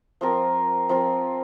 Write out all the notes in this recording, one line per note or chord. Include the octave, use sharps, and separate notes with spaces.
F3 C4 F4 A#4
F3 C4 F4 A#4